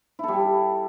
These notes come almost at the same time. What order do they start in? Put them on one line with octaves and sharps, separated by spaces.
E4 A4 G3